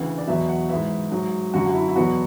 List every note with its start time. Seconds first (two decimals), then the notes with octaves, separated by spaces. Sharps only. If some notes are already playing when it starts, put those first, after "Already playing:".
Already playing: D2 C#3 E3 F#5
0.18 D5
0.27 E2 B2 F#3 E5
0.49 F#5
0.69 G#2 E3 E5
1.11 G#2 F#3
1.54 F#2 D3 F#3 F#4
1.66 F#4
1.74 E4
1.88 E4
1.96 E2 B2 F#3 F#4